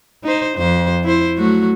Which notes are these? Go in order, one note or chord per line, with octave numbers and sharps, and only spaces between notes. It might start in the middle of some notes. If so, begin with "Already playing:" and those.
D#4 C5
F2 C5
E4 C5
F#3 A3 F#4